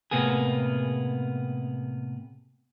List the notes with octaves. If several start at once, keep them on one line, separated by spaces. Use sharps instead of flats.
A2 C3 A#3 B3 G#4